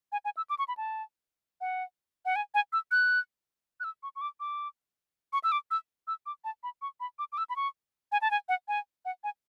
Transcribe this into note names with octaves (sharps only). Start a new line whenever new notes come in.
G#5
G#5
E6
D6
C#6
B5
A5
F#5
F#5
G#5
G#5
E6
F#6
F#6
E6
C#6
C#6
D6
D6
C#6
E6
D6
E6
E6
D6
A5
B5
C#6
B5
D6
D6
E6
B5
C#6
G#5
A5
G#5
F#5
G#5
F#5
G#5